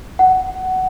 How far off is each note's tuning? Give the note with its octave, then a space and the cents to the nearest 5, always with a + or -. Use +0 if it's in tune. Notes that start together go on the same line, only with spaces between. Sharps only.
F#5 +15